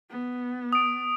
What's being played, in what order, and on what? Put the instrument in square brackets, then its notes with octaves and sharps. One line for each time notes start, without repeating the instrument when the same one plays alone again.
[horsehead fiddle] B3
[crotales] D#6 D7